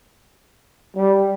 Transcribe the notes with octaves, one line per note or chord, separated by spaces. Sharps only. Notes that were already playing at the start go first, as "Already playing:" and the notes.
G3